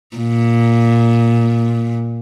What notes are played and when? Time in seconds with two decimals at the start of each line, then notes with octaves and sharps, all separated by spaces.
0.17 A#2